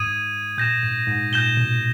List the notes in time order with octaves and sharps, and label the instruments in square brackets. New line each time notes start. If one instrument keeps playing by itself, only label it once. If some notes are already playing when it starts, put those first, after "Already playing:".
Already playing: [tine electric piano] G#2 [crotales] D#6 G#6 D#7
[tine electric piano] A#2 [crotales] G6 A#6 E7
[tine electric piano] G#2
G#2
[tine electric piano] A#2 [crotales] G6 A#6 E7 G7
[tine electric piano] B2